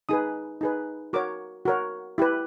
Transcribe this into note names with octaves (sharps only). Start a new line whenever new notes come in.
D#4 G#4 B4 D#6
D#4 G#4 B4
F#4 A#4 C#5 D6
F#4 A#4 C#5
E4 G4 B4